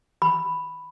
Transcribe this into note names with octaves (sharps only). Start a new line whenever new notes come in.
B5